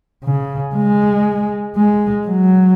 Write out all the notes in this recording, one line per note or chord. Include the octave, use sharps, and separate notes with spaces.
C#3
G#3
G#3
F#3